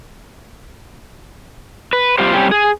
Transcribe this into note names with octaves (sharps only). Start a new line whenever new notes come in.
B4
G3 C4 F4 G4 C5
G3 C4 C#4 G4
G#4